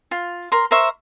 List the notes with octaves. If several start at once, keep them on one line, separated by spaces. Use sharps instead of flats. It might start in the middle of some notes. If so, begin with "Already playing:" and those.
F4
A#4 C6
A#4 C5 E5 C#6